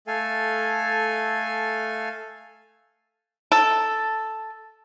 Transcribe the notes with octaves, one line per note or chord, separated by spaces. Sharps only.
A3 A4 F5 G#5
A4